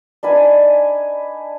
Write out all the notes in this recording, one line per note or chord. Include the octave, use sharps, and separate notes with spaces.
D4 D#4 B4 G#5